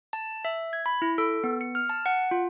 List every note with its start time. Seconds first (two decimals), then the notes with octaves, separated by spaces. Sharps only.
0.13 A5
0.45 E5
0.73 G#6
0.86 B5
1.02 E4
1.18 A4
1.44 B3
1.61 C#7
1.75 F6
1.90 A5
2.06 F#5
2.31 F4